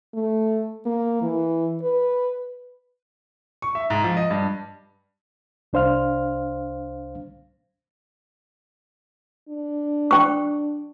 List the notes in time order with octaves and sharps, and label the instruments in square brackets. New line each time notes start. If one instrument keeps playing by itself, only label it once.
[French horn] A3
A#3
E3
B4
[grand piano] C#6
E5
G#2
F3
D#5
G2
[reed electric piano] C2 D4 C5 F5 F6
[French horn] D4
[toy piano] G5 C#6